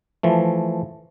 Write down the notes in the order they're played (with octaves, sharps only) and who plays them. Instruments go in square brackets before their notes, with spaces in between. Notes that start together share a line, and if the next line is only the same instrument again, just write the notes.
[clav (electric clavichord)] E3 F3 A3